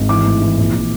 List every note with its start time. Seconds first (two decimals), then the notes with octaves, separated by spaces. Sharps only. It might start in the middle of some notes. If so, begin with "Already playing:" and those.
Already playing: G#1
0.09 E3 D6
0.25 A2
0.41 E3
0.58 A#1
0.74 E3